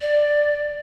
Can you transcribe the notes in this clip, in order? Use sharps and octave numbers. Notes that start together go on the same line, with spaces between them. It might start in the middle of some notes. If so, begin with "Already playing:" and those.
D5